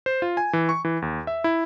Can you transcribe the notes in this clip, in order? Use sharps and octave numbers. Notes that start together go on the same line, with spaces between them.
C5
F4
G#5
E3
C#6
E3
D#2
E5
E4